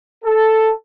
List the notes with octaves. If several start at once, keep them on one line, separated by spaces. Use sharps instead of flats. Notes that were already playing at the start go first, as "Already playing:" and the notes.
A4